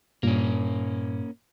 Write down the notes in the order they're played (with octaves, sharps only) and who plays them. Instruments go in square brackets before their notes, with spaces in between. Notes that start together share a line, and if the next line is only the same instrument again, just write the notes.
[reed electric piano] G2 A#2 [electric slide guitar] A#3 C#4